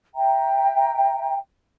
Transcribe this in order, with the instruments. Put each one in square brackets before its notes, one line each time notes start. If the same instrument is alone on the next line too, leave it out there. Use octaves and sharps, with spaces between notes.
[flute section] E5 G5 A#5